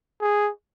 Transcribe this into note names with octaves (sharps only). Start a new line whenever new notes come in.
G#4